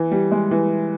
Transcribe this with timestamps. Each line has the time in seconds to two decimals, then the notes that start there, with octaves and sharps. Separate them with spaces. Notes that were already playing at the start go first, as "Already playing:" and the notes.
Already playing: E3
0.11 G3
0.31 G#3
0.51 E3